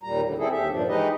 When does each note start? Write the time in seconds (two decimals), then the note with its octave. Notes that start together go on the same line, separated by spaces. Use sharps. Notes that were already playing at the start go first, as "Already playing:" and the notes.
0.03 D#2 A#2 G3 A#5
0.24 A2 D3 G3
0.38 G3 C4 E4 G#4 A4
0.52 D#2 G4 E5
0.70 G2 A#2 F3 D4
0.88 E3 G#3 D#4 G4 B4 D#5